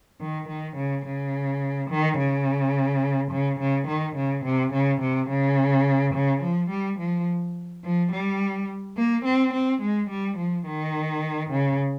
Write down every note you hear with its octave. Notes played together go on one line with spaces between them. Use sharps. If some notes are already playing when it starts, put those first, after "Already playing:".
D#3
D#3
C#3
C#3
D#3
C#3
C#3
C#3
D#3
C#3
C3
C#3
C3
C#3
C#3
F3
G3
F3
F3
G3
A#3
C4
C4
G#3
G3
F3
D#3
C#3